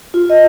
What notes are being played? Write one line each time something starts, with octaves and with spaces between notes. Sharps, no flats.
F4
D#5